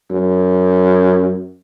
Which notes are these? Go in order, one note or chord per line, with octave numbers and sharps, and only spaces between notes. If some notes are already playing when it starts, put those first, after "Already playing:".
F#2